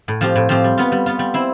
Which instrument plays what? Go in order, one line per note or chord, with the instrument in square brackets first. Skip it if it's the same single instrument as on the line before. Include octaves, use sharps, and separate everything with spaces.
[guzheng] A2
F3 C4 G4
A2
F3 C4 G4
G3
B3 F4
G3
B3 F4
G3
C4 E4